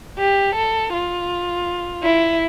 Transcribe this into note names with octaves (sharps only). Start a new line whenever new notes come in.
G4
A4
F4
E4